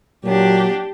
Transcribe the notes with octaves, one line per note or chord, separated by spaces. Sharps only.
A#2 F#3 D4 G4